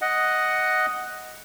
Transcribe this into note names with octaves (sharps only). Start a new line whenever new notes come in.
D#5 F#5